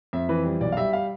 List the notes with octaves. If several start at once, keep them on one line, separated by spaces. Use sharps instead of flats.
F2 E5
E3 B4
G3
B1 D5
F5
G3 E5
F5